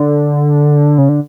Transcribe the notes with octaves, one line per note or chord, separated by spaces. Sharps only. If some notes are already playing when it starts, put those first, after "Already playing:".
Already playing: D3
C#3
D3